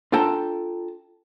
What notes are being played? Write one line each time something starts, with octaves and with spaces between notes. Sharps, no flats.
D4 F4 A4 G5 A5 A#5